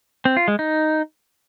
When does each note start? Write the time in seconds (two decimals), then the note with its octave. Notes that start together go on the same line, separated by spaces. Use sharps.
0.25 C4
0.37 F4
0.48 G#3
0.59 D#4